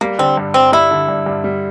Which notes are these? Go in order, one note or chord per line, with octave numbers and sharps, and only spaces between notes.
G3 A#3
D3 C4
G2
G2 C4
G3 E4
D3
G2
G2
G3